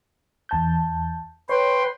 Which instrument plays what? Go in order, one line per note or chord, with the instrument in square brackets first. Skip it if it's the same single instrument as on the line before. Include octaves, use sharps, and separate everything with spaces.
[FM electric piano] E2 A5 G6
[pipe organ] B4 G5 C6 [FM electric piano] C#5